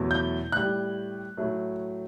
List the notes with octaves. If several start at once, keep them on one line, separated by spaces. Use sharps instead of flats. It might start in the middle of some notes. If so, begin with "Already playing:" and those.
Already playing: E2 B2 F#3 A3
G6
A2 G3 F#6
A2 F#3 A3